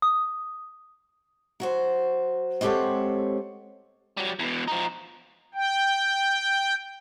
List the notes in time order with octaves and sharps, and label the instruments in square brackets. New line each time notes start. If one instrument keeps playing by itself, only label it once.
[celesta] D#6
[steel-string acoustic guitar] F#3 F#4 C5
G#3 C4 G4 A4 C#5 F#5
[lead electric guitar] F#3 G3
E2 B2
F3 D#4
[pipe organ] G5